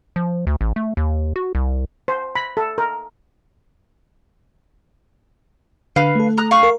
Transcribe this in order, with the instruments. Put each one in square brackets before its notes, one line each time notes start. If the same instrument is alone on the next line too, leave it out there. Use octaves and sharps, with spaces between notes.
[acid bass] F3
D2
A1
A3
D#2
F#4
C2
[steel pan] C5
B5
A4
A#4
[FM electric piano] D3 [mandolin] B4 F5
[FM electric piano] A3 A4
[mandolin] A#5 D#6 F#6
F5 C#6
[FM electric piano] A#4